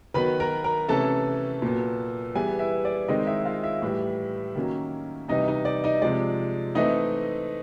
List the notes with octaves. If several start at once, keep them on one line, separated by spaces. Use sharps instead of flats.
D#3 F#3 B3 B4 B5
A#4 A#5
A#4 A#5
C3 E3 A3 C#4 A4 A5
A#2 F#3 B3
E3 G3 B3 G#4 G#5
E4 E5
D5
D#3 G#3 C4 D#4 D#5
E4 E5
F4 F5
E4 E5
A2 E3 G3
D#3 F#3 A#3 C#4
C3 E3 G3 D#4 D#5
D#4 D#5
D5
D#4 D#5
C3 F3 G#3 D5
E3 A3 C4 D#4 D#5